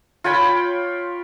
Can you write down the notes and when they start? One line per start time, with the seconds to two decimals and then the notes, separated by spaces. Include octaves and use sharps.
0.24 F4 C#5 G5 B5